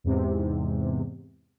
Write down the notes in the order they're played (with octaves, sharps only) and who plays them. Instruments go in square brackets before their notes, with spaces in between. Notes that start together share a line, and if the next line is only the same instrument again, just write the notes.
[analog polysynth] E2 G#2 C3